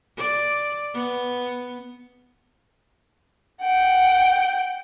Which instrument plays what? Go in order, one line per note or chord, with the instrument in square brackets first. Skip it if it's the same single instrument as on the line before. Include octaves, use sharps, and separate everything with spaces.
[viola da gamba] D5
B3
[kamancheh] F#5 G5